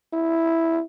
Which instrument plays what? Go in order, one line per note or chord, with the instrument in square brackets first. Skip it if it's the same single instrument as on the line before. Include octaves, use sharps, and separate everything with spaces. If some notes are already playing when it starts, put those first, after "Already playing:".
[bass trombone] E4